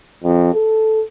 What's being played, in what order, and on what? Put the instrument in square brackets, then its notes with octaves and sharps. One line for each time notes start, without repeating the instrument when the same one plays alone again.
[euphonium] F2
A4